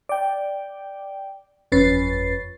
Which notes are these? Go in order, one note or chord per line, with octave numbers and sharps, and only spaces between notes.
D5 G5
G1 F2 C#4 B4 A6 C7